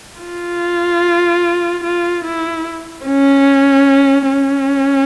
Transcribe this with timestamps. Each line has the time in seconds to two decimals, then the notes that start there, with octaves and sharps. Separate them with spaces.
0.21 F4
1.84 F4
2.25 E4
3.06 C#4
4.29 C#4